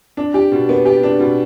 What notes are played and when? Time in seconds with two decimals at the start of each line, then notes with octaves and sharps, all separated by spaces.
0.17 D4
0.34 G4
0.52 B2
0.69 B3
0.85 G4
1.03 D4
1.19 B2